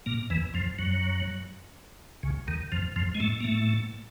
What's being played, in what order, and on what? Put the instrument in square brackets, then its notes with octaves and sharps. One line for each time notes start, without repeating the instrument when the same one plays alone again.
[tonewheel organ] A#2 A#3
E2 E3
F2 F3
F#2 F#3
C#2 C#3
D#2 D#3
F2 F3
F2 F3
G#3
A2 A3
A#3
A2 A3